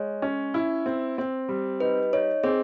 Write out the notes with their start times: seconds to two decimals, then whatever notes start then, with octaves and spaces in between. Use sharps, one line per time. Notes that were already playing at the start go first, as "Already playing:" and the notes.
Already playing: G#3 C#5
0.22 C#4
0.54 E4
0.86 C4
1.18 C4
1.49 G3
1.80 D#4 B4
2.13 D#4 C#5
2.44 C4 G#4